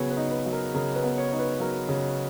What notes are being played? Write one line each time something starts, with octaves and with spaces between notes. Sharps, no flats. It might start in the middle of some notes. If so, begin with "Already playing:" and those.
Already playing: C#3 F#3 B3 G#4 C#5
B4
D#4
B4
F#3
A#4
C#3 A#4
B4
B3
C#5
D#4 C#5
B4
F#3 A#4
C#3